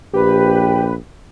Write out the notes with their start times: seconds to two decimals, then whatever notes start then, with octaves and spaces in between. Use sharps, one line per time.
0.14 A#1 G4 B4